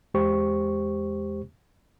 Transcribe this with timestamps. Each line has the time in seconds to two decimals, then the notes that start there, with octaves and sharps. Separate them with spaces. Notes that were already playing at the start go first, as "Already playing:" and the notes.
0.14 E2 G#3 G4 C5 C#6